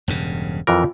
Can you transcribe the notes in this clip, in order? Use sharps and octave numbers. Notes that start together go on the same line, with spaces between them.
E1 G2 C#3
F2 E3 F4 A#4